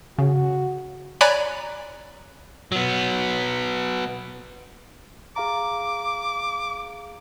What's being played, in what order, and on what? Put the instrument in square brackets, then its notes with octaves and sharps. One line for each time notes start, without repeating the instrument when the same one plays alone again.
[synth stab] C#3 [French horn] F#4
[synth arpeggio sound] C#5 D5 G#5 A#5 B5 F#6
[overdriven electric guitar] F#3 B3
[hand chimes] G#4 F5 A#5 [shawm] D6